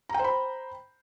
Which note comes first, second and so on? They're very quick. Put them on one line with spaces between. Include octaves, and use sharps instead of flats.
A#5 G5 C5 B5